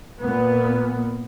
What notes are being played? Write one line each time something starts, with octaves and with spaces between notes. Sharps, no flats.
A#2 B3